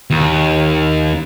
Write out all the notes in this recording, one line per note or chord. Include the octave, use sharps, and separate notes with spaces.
D#2